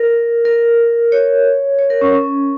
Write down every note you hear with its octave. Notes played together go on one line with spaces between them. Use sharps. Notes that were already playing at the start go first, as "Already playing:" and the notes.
Already playing: A#4
A#4
C#5
C#5
A#4
C#4
C#4